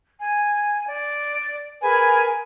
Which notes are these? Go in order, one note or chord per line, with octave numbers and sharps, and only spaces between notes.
G#5
D5
G#4 A#4 B4 G#5